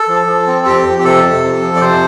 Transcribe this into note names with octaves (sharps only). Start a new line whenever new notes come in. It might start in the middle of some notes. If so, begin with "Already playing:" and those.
Already playing: A4
F3
F3
C4
F2 G4
F2
G4
C3 A4
C3
F2
F3
D5
C3 C5